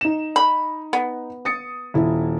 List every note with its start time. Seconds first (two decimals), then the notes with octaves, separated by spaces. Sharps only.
0.01 D#4 E7
0.36 B5
0.93 B3
1.45 D#6 A6 C#7
1.94 D#1 E4